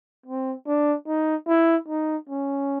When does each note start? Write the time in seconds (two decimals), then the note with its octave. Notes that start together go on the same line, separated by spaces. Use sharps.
0.26 C4
0.67 D4
1.07 D#4
1.48 E4
1.88 D#4
2.29 C#4